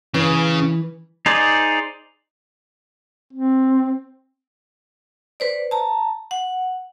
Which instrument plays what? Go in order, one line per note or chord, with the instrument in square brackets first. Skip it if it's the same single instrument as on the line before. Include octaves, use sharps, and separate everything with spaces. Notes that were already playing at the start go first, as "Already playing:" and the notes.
[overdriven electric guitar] C#3 [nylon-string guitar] E3
[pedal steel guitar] D#4 G#4 C5 D5
[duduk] C4
[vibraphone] B4 C5 D5
A5 A#5
F#5